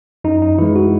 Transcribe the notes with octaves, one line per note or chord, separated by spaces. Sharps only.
F#2 D#4
D#4
E3 G#3 E4
F#4